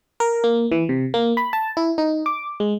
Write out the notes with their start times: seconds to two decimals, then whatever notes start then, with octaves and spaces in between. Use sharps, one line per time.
0.20 A#4
0.44 A#3
0.72 E3
0.89 C3
1.14 A#3
1.37 B5
1.53 A5
1.77 E4
1.98 D#4
2.26 D6
2.60 G#3